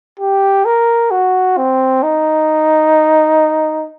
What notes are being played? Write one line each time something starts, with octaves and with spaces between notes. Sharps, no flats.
G4
A#4
F#4
C4
D#4